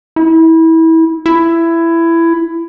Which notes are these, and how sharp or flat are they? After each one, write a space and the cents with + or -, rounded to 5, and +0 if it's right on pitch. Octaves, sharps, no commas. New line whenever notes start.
E4 -25
E4 +15